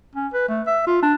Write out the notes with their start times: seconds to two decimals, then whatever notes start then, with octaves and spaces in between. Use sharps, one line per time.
0.15 C#4
0.34 B4
0.48 A3
0.67 E5
0.87 F4
1.02 D4